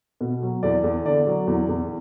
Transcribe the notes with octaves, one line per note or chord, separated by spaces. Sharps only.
B2
F#3
E2 D5
E2
D3 D5
F#3
E2
E2